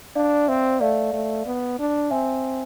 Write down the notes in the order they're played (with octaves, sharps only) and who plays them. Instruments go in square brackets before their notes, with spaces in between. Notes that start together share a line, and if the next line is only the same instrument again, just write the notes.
[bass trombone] D4 [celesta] D5 F5
[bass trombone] C4 [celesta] C5 E5
[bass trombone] A3 [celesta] D5 F5
[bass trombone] A3
B3
D4
[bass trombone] C4 [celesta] E5 G#5